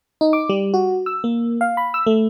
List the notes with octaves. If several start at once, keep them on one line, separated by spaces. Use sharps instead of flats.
D#4
D6
G3
F#4
E6
A#3
F5
B5
E6
A3